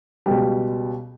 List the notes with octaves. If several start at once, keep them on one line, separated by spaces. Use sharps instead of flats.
C#2 B2 G3 G4